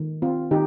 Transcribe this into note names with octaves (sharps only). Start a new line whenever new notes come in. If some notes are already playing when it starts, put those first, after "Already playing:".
Already playing: D#3
C4 F4
D#3 D#4 G4